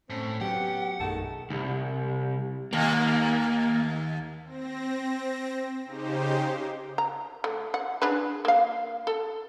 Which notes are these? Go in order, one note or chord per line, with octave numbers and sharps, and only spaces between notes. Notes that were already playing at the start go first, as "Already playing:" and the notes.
A2 C4 C#4
F#3 B3 C#4 G4 F#5
A#1 F#2 B2 D#3 A3 G#4 A5
C2
D#2 A#3
C4 A#6
C#3 D#4 G4 C5
A#5
A3
F#5
D4 G#4 B4
A#3 F5
A4